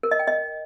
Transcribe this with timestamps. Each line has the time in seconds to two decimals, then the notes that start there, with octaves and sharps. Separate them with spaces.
0.03 A#4
0.11 D#5
0.19 G5
0.27 D#5